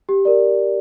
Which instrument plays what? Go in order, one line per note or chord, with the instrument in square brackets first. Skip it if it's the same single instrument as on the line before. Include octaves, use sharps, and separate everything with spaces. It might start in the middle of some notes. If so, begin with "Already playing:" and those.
[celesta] G4
A#4 D5